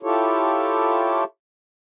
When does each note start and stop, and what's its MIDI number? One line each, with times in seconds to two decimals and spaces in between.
0.03 1.24 64
0.03 1.24 65
0.03 1.24 67
0.03 1.24 69
0.03 1.24 73